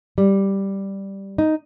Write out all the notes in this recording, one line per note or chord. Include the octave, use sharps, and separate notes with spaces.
G3
D#4